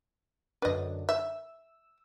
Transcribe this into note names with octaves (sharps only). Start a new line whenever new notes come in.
F#2 D3 D4 B4 D#5
E5 E6